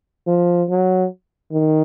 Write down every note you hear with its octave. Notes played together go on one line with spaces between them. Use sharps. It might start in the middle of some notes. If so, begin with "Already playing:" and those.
F3
F#3
D#3